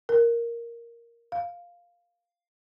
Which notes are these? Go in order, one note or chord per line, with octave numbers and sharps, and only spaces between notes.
A#4
F5